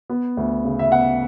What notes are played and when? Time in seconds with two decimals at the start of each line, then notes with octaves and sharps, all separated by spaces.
0.10 B3
0.37 D2
0.65 C#3
0.79 E5
0.91 B3 F#5